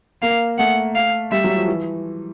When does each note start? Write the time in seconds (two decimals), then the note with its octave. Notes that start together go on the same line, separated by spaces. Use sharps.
0.22 A#3 F5
0.58 A3 F#5
0.95 F5
1.32 G3 E5
1.44 F#3
1.56 F3
1.67 E3